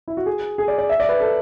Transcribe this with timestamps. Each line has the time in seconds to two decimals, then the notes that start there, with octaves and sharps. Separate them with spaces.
0.08 E4
0.17 F#4
0.26 G#4
0.58 G#4
0.68 D5
0.78 D5
0.89 E5
1.00 D5
1.09 B4
1.20 A4